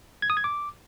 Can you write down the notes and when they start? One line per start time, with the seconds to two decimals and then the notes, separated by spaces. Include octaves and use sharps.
0.22 G#6
0.30 D#6
0.37 G#6
0.44 D6